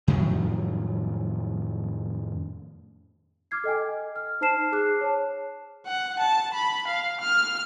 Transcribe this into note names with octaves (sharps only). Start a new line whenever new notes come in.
F2 A2 D#3 F#3
D6 F6 G#6 C7
A4 D#5 G5 G#5
F6
D#4 C5 A5 F6 C7 E7
G#4 D6 F#6 C7
C#5 A5
F#5
A5
B5
F5
F6